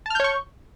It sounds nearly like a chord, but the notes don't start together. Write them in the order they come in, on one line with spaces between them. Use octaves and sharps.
A5 F6 G6 C#5 C#6